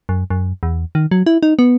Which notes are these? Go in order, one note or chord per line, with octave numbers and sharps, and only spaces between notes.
F#2
F#2
E2
D#3
F#3
E4
D#4
B3